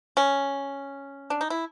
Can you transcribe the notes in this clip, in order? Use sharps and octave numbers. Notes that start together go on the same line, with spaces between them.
C#4
D4
D#4
E4